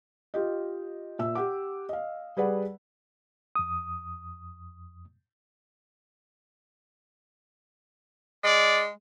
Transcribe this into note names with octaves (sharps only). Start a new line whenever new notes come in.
F4 G4 D#5
A#2 E5 E6
G4 F#5 D6
D#5 F5
G3 G#4 B4 D5 F#5
F2 D#6
G#3 D5